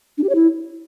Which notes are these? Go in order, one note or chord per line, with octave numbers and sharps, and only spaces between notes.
D4
G4
C#5
E4